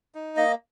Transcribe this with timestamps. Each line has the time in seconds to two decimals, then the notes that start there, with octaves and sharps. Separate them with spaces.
0.15 D#4
0.37 A#3 D#5